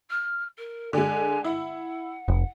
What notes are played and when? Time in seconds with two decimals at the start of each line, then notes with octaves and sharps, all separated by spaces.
0.10 F6
0.58 A#4
0.93 D3 G#3 G#5
1.44 E4 F#5
2.28 F1